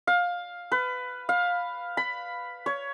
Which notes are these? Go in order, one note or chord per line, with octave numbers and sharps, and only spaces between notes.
F5
B4
F5
B5
C#5